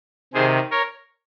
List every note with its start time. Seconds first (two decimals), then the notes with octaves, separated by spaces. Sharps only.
0.34 C3 D#3 G#4 C5
0.71 A#4 C#5